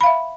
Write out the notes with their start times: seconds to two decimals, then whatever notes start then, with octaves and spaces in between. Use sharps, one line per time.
0.01 B5
0.03 F5
0.06 E5